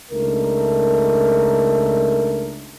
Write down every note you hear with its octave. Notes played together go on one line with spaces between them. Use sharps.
C#2 A3 D4 D#4 A#4